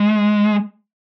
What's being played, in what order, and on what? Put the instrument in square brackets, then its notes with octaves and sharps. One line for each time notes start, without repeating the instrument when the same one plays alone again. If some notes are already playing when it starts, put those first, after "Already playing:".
Already playing: [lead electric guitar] G#3